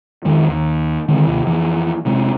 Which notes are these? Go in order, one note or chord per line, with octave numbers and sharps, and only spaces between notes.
F2 D#3 G#3
D#2
D3 D#3 G#3 C4
D#2 C3
F2 E3
F1 C3 G#3